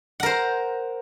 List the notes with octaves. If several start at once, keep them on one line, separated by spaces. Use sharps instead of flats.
A#4 C5 F#5